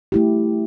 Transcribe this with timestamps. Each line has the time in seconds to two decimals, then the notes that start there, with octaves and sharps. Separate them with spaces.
0.12 A3 E4 G4